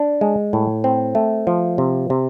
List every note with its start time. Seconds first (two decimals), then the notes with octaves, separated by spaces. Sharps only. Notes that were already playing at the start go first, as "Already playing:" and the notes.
Already playing: D4
0.21 G#3
0.53 A2
0.84 C4
1.15 A3
1.47 F3
1.78 C3
2.10 C3